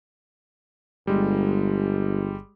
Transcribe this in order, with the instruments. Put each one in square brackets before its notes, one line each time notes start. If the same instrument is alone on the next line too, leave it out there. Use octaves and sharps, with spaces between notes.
[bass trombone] G1 [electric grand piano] G3 G#3